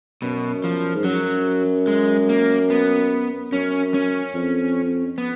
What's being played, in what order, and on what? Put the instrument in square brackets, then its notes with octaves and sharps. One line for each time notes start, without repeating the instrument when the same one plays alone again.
[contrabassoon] F#2 [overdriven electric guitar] B2
[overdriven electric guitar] F3
[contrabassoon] G#2
[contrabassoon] F#2 [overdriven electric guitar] F#3
[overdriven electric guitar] G#3
A#3
B3
[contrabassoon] F#2 [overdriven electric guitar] C#4
[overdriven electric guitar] C#4
[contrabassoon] F2
[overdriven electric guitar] B3